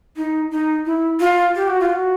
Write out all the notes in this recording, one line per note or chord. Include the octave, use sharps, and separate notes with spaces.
D#4
D#4
E4
F4
G4
F#4
F4
F#4